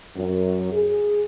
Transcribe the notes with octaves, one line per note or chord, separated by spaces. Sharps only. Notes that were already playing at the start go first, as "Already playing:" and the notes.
F#2
G#4